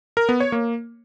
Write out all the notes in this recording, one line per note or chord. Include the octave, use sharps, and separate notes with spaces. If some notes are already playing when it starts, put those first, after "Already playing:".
A#4
B3
C#5
A#3